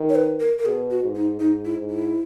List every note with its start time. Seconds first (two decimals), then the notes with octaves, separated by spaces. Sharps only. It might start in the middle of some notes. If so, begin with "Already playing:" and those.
Already playing: D#3
0.09 C#5
0.15 B4
0.40 A#4
0.59 A#4
0.65 B2 G#4
0.91 F#4
1.03 G#2
1.15 D#4
1.40 G#2 D#4
1.65 E4
1.78 G#2
1.90 E4